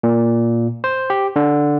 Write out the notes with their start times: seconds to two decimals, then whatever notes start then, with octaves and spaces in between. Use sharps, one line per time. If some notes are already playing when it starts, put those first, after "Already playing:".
0.03 A#2
0.84 C5
1.10 G4
1.36 D3